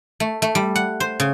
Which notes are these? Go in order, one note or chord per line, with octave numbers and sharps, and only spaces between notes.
A3
A3
G3
F#5
C5
C#3